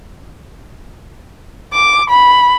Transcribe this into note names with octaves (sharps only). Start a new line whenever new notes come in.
D6
B5